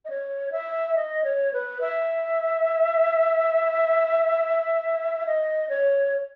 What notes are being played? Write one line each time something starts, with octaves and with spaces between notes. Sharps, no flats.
D#5
C#5
E5
D#5
C#5
B4
E5
D#5
C#5